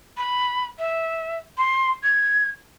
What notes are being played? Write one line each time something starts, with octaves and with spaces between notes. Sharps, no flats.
B5
E5
C6
G#6